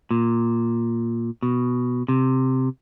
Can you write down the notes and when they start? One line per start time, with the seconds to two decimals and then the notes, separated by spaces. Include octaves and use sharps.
0.11 A#2
1.43 B2
2.09 C3